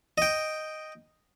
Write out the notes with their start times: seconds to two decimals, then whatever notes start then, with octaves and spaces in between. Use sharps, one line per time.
0.18 D#5 G5